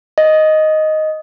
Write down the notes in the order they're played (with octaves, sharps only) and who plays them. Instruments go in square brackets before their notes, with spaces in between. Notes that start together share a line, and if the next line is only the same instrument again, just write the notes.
[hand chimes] D#5